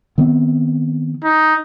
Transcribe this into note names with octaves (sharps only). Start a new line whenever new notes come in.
D#3 B3 C4
D#4